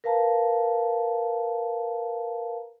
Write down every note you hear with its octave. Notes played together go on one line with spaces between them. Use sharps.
A#4 B4 F5 A5 A#5